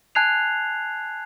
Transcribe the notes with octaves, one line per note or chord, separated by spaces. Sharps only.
G#5 A5 F#6 G#6 C7 F7